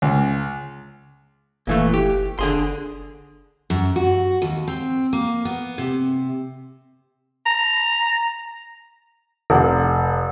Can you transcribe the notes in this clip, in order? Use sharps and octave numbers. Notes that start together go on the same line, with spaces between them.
C#2
F#1 A#2 E3 A3
G4
F#1 D3 G#4 C6
F#2
F#4
D#2
C4
A#3
B3
C3
A#5
F1 F#5